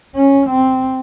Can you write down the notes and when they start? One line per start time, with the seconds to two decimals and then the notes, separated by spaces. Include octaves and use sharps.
0.16 C#4
0.50 C4